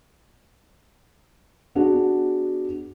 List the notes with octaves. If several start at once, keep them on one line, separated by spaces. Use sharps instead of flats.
B3 D4 F#4 G#4